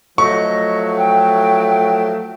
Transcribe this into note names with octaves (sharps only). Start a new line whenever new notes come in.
F3 F#3 A3 D#5 C#6
G5